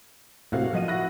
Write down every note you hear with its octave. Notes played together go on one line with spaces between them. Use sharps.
A2 C3 A#3 F#4 F5
F3 D#5 F#5 D#7
E4 F#4 F#6 A#6